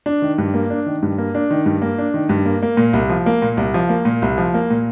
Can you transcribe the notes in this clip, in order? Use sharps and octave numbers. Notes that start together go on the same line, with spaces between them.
D4
D#3
G2
A#3
D4
D#3
G2
A#3
D4
D#3
G2
A#3
D4
D#3
G2
A#3
A#3
A#2
C2
F3
A#3
A#2
C2
F3
A#3
A#2
C2
F3
A#3
A#2